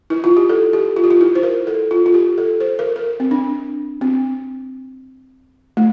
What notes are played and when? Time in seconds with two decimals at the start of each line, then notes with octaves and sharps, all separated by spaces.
0.10 E4
0.24 F4
0.37 G4
0.49 A4
0.73 G4
0.96 F4
1.04 G4
1.11 F4
1.21 E4
1.35 C5
1.43 A#4
1.67 A4
1.91 F4
2.06 F4
2.14 G4
2.38 A4
2.60 C5
2.79 A#4
2.96 A#4
3.20 C4
3.31 D4
4.01 C4
5.77 A3